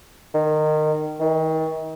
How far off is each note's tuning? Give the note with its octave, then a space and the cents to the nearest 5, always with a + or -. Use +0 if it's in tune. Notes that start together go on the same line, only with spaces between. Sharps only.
D#3 -20
D#3 +35